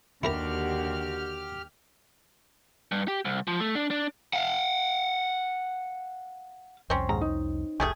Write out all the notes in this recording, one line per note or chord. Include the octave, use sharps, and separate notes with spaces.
D#2 D3 E4 F#4 G4 A#4 A#5 F6
G2
G4
C2
F3
A3
D4
D4
F5 F#5
C2 F2 C4 C#4
D#2 G#2 A#5
D#4
F1 C2 G3 A3 G#4 G#5